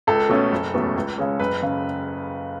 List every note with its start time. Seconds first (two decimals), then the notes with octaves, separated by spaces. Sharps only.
0.07 C#2 A4
0.29 B2 A3 C#4
0.52 F#1
0.74 E2 B2 A3 C#4
0.96 C#2
1.18 C#3 G#3 C#4
1.40 F#1 B4
1.63 C#3